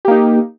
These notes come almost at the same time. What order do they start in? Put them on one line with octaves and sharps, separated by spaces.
G4 A#3 D#4